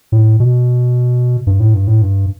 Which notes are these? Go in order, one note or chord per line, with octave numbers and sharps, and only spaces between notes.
A2
B2
G2
A2
G2
A2
G2